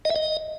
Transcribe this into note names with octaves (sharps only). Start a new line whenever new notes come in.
D#5
E5
D#5